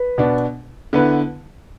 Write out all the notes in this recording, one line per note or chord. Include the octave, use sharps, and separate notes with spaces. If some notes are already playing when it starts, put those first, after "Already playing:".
Already playing: B4
B2 B3 D4
D3 B3 E4 B4